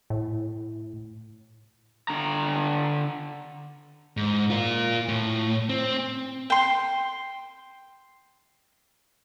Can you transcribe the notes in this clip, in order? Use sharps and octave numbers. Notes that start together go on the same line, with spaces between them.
A2
D3 A#5
G#2
F4 A#4
A2
C4
G5 C6